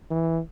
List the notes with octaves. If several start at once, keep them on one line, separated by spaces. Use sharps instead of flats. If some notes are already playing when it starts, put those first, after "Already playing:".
E3